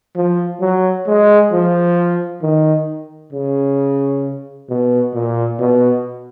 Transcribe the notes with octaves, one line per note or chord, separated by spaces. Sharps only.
F3
F#3
G#3
F3
D#3
C#3
B2
A#2
B2